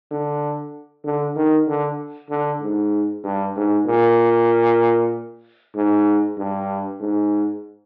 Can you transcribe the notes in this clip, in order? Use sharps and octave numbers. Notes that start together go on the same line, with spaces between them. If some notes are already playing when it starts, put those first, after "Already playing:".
D3
D3
D#3
D3
D3
G#2
G2
G#2
A#2
G#2
G2
G#2